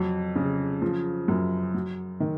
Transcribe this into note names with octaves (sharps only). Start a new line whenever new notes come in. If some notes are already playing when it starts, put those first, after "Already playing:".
Already playing: F2 F#3
C#3
F3
F#2
F#3
D#3